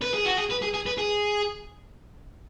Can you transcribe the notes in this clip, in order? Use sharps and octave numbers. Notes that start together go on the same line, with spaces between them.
B4
G#4
F#4
G#4
B4
G#4
G#4
B4
G#4